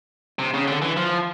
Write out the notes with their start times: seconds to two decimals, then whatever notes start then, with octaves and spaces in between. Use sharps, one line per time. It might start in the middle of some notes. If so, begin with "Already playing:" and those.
0.39 C3
0.54 C#3
0.68 D3
0.82 E3
0.97 F3